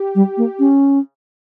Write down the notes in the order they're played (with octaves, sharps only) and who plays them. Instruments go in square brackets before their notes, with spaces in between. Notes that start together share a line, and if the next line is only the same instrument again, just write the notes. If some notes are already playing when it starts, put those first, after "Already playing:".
Already playing: [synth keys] G4
[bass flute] G3
A#3
C#4